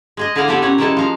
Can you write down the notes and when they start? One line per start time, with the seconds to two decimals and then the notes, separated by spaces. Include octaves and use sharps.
0.17 G#3 G#4 D#5
0.35 D3 E4 G#4 D5 F5 F#5
0.48 B3 C4 G4 A4 B4 D5
0.62 A#2 C#4 C#5 F#5
0.78 D#3 G3 G#3 E4 A4 A5
0.97 F3 F5 A#5